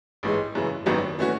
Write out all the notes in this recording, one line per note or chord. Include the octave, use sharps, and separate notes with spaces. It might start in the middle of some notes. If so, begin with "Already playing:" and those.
A1 G#2 E3 G#3
F#2 C#3 E3
G#1 F#2 D#3 F#3 B3
E3 A3 C#4 F#4